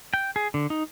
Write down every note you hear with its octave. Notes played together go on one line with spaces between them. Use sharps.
G5
G#4
D3
D#4